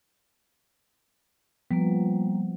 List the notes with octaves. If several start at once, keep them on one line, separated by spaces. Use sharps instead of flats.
F3 G3 A#3 B3